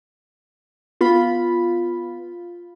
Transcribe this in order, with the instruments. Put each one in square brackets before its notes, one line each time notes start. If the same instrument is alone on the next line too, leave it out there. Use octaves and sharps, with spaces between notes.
[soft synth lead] B3 [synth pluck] F4 B5